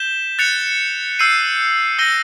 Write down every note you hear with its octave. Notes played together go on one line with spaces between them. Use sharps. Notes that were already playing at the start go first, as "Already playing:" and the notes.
Already playing: G6 B6 E7 G7
F#6 A6 C#7 F7
E6 G6 C7 D#7
E6 G6 A#6 D#7 G7